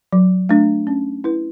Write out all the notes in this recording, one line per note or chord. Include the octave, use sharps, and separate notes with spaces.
F#3
A3 D4
C#4
E4 B4